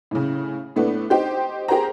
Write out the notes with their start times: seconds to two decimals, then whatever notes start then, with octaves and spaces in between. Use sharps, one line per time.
0.11 A2 C#3
0.76 A2 A3 B3 D4
1.10 D#4 G4 C5
1.68 G4 G#4 A#4 C5 A#5